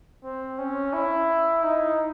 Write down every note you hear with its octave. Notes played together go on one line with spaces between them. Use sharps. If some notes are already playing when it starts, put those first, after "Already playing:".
C4
C#4
E4
D#4